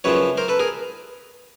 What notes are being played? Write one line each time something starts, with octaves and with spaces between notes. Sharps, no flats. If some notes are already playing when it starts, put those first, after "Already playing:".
F#2 C#3 F3 B4 C#5
A#4 C5
A4 B4
G#4 A#4